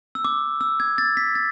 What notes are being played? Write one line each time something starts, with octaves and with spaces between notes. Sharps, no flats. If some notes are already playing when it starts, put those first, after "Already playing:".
E6
D6
E6
G#6
A6
B6
A6